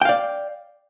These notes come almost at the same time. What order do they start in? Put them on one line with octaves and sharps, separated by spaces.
G5 F5 D5